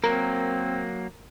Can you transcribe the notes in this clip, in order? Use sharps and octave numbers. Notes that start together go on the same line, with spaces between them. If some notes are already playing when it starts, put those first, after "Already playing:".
F#3 A#3 C4 A#4